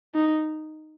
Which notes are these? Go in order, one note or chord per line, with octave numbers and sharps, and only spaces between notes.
D#4